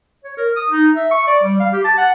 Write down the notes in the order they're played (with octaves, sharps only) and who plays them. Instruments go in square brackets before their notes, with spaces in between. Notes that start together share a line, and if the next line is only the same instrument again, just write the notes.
[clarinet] C#5
A#4
D#6
D#4
E5
C#6
D5
G3
F5
G4
A5
F#5